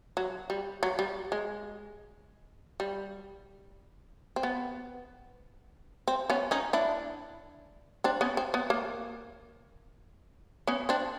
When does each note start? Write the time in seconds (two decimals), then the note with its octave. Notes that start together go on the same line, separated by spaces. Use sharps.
0.17 F#3
0.50 G3
0.83 F#3
0.99 G3
1.32 G#3
2.80 G3
4.36 C4
4.43 B3
6.08 C4
6.30 B3 C#4
6.51 C#4 D#4
6.73 D4 E4
8.04 C4 D4
8.21 B3 C#4
8.37 C4
8.54 B3
8.70 A#3
10.67 B3 C#4
10.89 C4 D4